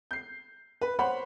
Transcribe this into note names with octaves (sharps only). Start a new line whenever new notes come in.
G6 C7
B4
C5 C#5 F#5 B5